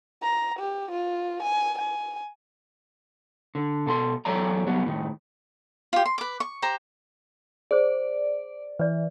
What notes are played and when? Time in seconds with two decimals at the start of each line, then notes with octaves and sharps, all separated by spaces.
0.23 A#5
0.59 G4
0.91 F4
1.43 G#5
1.78 G#5
3.55 D3
3.86 B2 A4 B5 C6
4.25 E2 F#3 A4 C#5 D5 A#5
4.66 F#3 G3 B3
4.86 A2 D#3
5.93 F4 G4
6.06 C6
6.18 B4 D6
6.40 C#6
6.62 G4 C5 A#5
7.71 G#4 C5 D5
8.79 E3 B4 D5